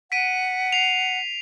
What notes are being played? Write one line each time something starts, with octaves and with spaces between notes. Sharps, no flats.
F#5 B6 D7 D#7
C7 F7